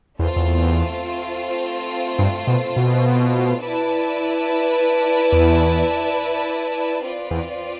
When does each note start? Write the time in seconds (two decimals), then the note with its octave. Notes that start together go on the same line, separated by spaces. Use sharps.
0.19 E2 A3 C4 F4 C5
0.36 E2
2.19 G2
2.47 B2
2.76 B2
3.61 E4 B4 D5 A5
5.32 E2
7.03 C4 F4 B4 D5
7.31 E2